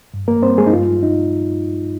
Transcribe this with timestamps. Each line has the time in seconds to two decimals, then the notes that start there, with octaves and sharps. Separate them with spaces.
0.14 G2
0.28 A#3 A#4
0.43 G3 C4 C5
0.58 G#3 G#4
0.67 D#4
0.72 G2 F4
1.03 D#4